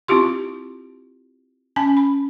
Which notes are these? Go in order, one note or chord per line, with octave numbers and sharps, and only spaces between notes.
C4 E4 F4 G4 C6
C#4 G#5 A5
B5